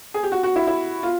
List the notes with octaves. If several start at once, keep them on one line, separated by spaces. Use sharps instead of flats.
G#4
G4
F#4
F#4
E4
E4
F4